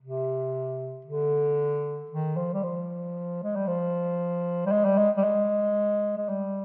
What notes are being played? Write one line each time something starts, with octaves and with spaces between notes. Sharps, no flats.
C3
D3
D#3
F3
G3
F3
G#3
G3
F3
G3
G#3
G3
G#3
G3
G#3
G#3
G3